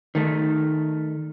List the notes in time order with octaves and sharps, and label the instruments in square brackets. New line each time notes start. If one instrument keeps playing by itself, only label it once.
[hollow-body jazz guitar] D#3 A3